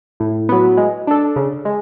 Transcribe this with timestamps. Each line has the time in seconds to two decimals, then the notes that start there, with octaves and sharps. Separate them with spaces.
0.20 A2
0.49 F#3 B3
0.77 G#3
1.07 D4 A4
1.36 C#3
1.65 G#3